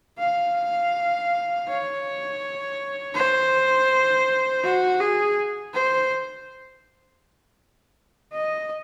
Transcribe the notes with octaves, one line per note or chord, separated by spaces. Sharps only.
F5
C#5
C5
F#4
G#4
C5
D#5